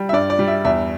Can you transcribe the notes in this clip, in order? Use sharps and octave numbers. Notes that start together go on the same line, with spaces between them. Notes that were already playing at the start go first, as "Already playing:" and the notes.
Already playing: G3
E5
G2 D5
D5
G3
E5
E2 E5